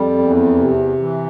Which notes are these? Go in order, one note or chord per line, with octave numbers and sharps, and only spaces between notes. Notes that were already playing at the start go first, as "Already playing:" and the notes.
Already playing: F2 G3
E2
C3
E3